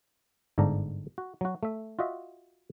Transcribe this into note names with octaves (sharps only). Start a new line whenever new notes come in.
G1 G#2 D3 D4 A#5
F#4
F#3 F#4
A3 E5
F4 F#4 D#5 E5